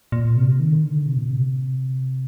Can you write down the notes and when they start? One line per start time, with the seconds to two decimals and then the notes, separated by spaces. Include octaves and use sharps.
0.12 A#2
0.36 C3
0.60 D#3
0.83 D3
1.06 C3
1.17 A#2
1.27 C3